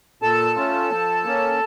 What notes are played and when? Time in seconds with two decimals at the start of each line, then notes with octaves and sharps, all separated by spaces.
0.22 A#2 A4 A5
0.56 A3 C#4 F4
0.91 F3
1.24 A#3 C#4